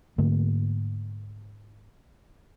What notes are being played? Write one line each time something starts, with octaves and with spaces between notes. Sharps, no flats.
G#2 D3 A3 A#3